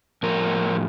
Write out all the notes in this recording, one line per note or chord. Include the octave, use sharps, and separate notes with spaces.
A2 F3 A#4